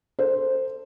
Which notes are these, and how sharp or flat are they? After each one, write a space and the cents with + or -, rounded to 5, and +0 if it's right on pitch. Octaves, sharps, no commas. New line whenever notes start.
A4 +30 C5 +0